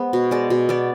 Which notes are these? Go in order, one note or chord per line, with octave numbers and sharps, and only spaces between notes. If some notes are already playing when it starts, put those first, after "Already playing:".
Already playing: G#3 B3 C5
B2
G#3 D5
B2
B3 D5